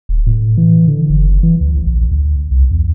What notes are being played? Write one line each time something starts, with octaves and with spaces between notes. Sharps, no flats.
D#1
A2
E3
D3
F#1
E3
D2
A#1
D2
C2
E2